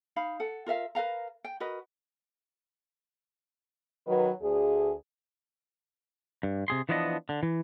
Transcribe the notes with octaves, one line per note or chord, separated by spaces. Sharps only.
D#4 F5 B5
A4 F#5
F4 A#4 E5 F5
A#4 B4 F5 A#5
G5
F#4 A#4 B4 D#5
D#3 F#3 B4
D2 G#4
G2
C3 G#4 C6
E3 F3 B3 D4 C#5 D#5
D3
E3